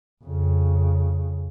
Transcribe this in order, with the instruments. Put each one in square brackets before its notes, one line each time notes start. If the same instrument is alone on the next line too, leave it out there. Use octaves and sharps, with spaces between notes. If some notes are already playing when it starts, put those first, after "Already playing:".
[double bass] F2 C#3